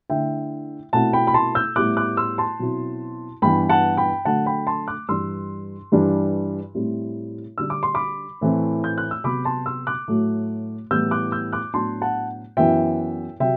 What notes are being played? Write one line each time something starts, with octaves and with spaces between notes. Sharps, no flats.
D3 A3 E4 E5 G5
B2 A3 C4 E4 F#5 A5
G5 B5
B5
A5 C6
E6 G6
A2 G3 B3 E4 D6 F#6
D6 F#6
C6 E6
A5 C6
B2 F#3 C4 E4
G2 E3 B3 G5 B5
F#5 A5
G5 B5
D3 F#3 A3 F#5 A5
G5 B5
A5 C6
D6 F#6
G2 E3 G3 D4 C6 E6
G2 E3 G3 D4
A2 G3 C4 E4
D3 G3 D4 E6
D6
C6
B5 D6
A2 E3 A3 C4
G6
F#6
E6
C3 F#3 B3 B5 D6
A5 C6
C6 E6
D6 F#6
A2 F#3 A3
A2 E3 G3 B3 E6 G6
D6 F#6
E6 G6
D6 F#6
A2 F#3 B3 D4 A5 C6
F#5 A5
F#2 E3 B3 E4 E5 G5
C3 F#3 E5 G5